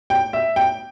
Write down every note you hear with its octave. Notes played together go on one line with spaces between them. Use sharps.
G5
E5
G5